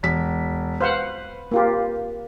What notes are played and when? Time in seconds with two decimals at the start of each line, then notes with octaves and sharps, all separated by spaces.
0.03 E1 B6
0.80 B4 C5 F5 F#5
1.51 A#3 F4 G4